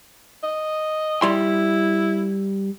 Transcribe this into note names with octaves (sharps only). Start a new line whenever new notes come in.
D#5
G3 E4 C6